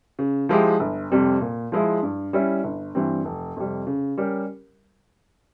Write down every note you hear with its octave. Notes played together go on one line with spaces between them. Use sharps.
C#3
F3 G#3 E4 G4
G1
F2 C3 G3 C4
A#2
F3 G#3 E4
G2
G3 C#4 E4
G1
G2 E3 G3 C4
F1
F2 C3 G3
C#3
G3 C#4 G4 A#4